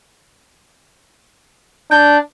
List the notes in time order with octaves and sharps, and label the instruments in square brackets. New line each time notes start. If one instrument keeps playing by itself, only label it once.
[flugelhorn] D4 [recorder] G6